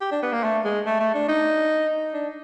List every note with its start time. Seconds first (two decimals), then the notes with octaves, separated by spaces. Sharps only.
0.01 G4
0.11 D4
0.22 B3
0.33 A#3
0.43 A3
0.64 G#3
0.86 A3
1.00 A3
1.14 D4
1.28 D#4
2.13 D4